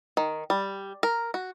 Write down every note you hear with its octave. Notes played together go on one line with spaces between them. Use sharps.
D#3
G3
A#4
F#4